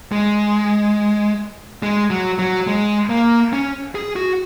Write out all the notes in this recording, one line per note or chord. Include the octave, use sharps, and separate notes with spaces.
G#3
G#3
F#3
F#3
G#3
A#3
C#4
G#4
F#4